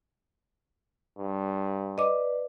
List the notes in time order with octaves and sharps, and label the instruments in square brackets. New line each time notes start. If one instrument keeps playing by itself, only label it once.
[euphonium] G2
[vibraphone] B4 D5 [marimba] D#5 D6